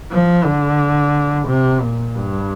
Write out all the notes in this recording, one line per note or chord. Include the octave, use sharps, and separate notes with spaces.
F3
D3
C3
A#2
G2